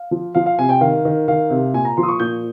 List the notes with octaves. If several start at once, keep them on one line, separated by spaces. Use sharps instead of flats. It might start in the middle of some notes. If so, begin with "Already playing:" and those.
Already playing: F5
F3
F3 F5
F5
C3 G#5
G5
D#3 F5
D#3
D#3 F5
C3
A#2 G#5
A#5
F3 C6
D#6
C#6
A#2 G6